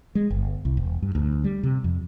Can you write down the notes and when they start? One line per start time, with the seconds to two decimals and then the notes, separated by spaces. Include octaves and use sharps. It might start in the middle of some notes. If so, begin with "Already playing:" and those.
0.15 G#3
0.31 G1
0.65 C2
0.77 E1
1.02 G2
1.15 D2
1.44 G3
1.63 C3
1.84 F2